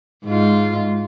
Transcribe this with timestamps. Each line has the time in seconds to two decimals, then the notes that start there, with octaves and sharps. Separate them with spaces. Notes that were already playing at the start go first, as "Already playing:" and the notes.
0.25 G#2 F4